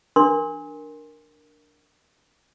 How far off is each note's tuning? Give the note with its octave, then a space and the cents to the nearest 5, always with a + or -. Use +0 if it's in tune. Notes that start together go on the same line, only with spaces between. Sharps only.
D4 +0 A#4 +0 C6 +15